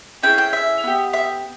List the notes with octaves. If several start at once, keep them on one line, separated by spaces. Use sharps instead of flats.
C#4 E4 G#4 G5
G5
E5
B3 G4
E5